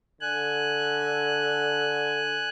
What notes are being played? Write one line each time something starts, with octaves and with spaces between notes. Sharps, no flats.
D3 G#5 F#6